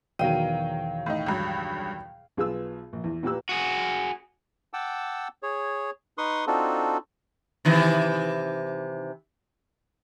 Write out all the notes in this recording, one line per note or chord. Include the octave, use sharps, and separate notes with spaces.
E2 B2 D#3 F#3 F5 G5 D#7
A2 D#4
C#2 G2 F#3
B1 F4 G#4 B4 E6
A#1
E2
A#2 A#3 G4 B4 E6
F#4 G#4
F#5 G5 A5 D6 E6
G#4 C#5
D#4 B4 C6 C#6 D#6
C4 D4 D#4 F4 F#4 A4
C3 D#3 E3